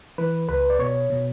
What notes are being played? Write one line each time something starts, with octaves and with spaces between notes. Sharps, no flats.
E3 B4
C#2 B4
D5
B2 C#5
B2